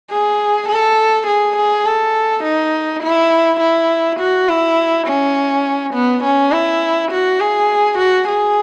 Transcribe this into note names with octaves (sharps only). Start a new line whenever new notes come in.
G#4
A4
G#4
G#4
A4
D#4
E4
E4
F#4
E4
C#4
B3
C#4
E4
F#4
G#4
F#4
G#4